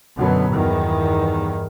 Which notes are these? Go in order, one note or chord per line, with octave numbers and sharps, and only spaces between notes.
F#2 B2 D3 F#3 B3
E2 G2 D#3